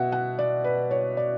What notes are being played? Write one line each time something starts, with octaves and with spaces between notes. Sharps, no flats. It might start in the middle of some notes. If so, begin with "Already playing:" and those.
Already playing: B2 E5 F#5
F#5
D5
B4
C#5
D5